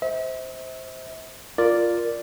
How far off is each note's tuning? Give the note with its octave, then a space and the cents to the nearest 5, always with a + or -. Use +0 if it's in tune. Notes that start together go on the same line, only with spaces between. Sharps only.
C5 +0 E5 -40
F4 +0 A#4 +0 D5 +0